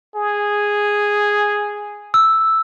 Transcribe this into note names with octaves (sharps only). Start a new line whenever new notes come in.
G#4
E6